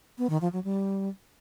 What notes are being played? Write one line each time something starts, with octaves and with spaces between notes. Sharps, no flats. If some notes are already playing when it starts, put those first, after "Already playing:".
B3
D#3
F3
F#3
G3